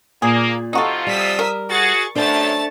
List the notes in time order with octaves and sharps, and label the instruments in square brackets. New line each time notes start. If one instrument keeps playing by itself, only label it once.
[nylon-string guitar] A#2 [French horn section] A#3 [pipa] G#4
[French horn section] C3 F3 F4 [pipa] D#4 F#4 A4
[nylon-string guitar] G3 [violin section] D#6 E6 B6
[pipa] A#4
[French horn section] F#4 G#4 [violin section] C#6 A6
[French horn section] F#2 [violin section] A3 A5 A6 [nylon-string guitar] D4 C5